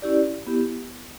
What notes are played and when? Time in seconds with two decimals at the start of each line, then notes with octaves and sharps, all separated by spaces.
0.02 C#4 E4 G4 D5
0.47 B3 E4 G4